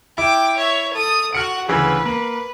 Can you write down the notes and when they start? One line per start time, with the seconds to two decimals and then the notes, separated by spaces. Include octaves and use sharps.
0.18 E4 G5 D6
0.57 C#5 E5
0.93 A4 D#6
1.33 F#4 F#5 F6 C#7 D7
1.68 D2 C#3 E3 B4
2.05 A#3